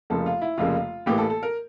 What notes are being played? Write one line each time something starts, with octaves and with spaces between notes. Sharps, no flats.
F1 F2 C#3 F3 A#3 A4
F4
E4
F1 F2 C#3 F3 A#3 F4
A1 A2 E3 A#3 G4
A4
A4
A#4